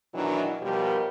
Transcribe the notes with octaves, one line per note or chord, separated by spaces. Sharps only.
B2 D#3 E3 F#3 D4 E4
D#2 B2 F3 G3 G4 A#4